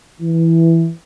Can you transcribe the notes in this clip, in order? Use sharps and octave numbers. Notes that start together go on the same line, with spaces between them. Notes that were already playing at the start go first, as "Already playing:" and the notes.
E3